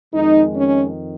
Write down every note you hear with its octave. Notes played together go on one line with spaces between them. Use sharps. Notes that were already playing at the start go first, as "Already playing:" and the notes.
F2 D#3 G#3 D#4
C#4